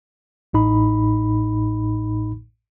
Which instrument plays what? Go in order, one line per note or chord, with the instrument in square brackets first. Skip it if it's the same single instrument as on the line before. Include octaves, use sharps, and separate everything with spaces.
[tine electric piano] A1 A2 D#4 B5